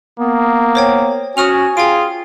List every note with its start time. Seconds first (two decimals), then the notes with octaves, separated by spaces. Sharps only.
0.19 A#3 B3
0.75 C5 C#5 G5
1.37 C#4 F#4 G#5 D#6 F6 F7
1.77 F4 G#4 G5 D7